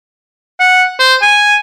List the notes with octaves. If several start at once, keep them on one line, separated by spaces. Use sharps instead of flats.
F#5
C5
G#5